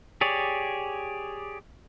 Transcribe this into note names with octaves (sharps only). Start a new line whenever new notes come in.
G4 G#4 C#5 D5